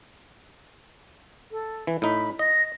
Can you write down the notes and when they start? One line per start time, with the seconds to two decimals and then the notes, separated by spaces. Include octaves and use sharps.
1.52 A4
1.87 E3
2.02 A2 D#4 B5
2.39 D#5 A#6